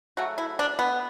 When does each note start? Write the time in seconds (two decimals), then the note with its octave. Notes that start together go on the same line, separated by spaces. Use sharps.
0.17 C#3 F#3 A3 F#4
0.38 E4
0.59 D4
0.79 B3